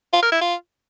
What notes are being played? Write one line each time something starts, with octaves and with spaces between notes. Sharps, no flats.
F4
A#4
E4
F4